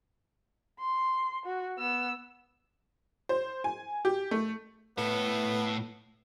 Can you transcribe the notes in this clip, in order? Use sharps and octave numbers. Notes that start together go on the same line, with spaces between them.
C6
F#4
B3 E6
C5
G#5
G4
A3
A2 B3 A4